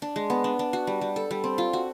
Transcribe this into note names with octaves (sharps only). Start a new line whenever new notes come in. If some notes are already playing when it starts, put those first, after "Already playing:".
D4
G#3
B3
D4
D4
F#4
G3
G3
A4
G3
C4
F4
F#4